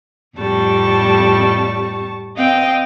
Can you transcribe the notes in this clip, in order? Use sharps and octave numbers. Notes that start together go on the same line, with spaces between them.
F2 A2 G3 A5 C#6
C4 D#5 F5 G5